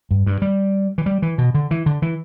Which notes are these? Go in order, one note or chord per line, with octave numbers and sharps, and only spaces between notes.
G2
G2
G3
E3
G3
E3
B2
D3
E3
D3
E3